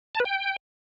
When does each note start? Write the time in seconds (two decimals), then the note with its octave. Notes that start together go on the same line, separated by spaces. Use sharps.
0.15 A5
0.20 B4
0.25 G5